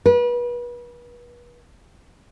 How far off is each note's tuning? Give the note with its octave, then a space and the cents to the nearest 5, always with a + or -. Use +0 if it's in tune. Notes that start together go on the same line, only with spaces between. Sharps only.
B4 -35